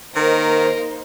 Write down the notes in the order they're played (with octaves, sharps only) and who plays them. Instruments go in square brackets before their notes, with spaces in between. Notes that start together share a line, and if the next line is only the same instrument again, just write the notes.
[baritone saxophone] D#3 [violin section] A#3 D#4 C5 [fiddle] A#4